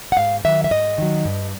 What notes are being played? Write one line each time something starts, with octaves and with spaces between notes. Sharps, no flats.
F#5
G#2 F5
D#3 F#3 E5
E5
G#2 D#5
D#3 F#3
G2